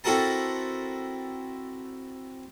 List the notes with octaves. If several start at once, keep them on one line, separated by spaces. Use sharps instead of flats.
C4 E4 F#4 A4 A#4 A5